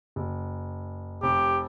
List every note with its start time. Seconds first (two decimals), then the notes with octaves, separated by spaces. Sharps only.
0.16 F#1
1.23 F1 G4